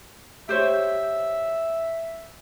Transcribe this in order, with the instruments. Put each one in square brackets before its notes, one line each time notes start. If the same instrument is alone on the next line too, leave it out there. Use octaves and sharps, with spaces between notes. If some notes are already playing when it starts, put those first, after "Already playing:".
[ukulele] G4 C5 C#5 [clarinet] E5